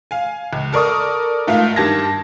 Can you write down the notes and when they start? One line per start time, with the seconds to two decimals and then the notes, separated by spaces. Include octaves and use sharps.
0.11 F5 G#5
0.53 C#2
0.73 A4 A#4 D5 C#6 D#6
1.47 G#2 A3 F4 A#4 F5
1.76 G2 D#3 G4 A5 G#6 A#6